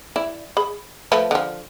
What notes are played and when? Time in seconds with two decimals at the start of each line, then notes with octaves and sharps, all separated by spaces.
0.16 E4 D5
0.57 G#4 B5
1.12 F3 A3 B4
1.31 D3 F3